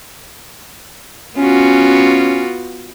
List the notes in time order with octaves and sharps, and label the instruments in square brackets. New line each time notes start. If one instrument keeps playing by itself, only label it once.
[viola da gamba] B3 F4 F#4 [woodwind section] C#4